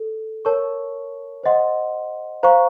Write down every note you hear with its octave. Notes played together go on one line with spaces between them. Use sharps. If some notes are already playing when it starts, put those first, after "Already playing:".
Already playing: A4
A#4 C#5 A5 C#6
C5 D#5 F#5 C6
C5 F5 A#5 C#6